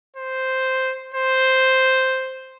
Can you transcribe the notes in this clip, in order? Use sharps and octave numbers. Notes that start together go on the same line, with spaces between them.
C5
C5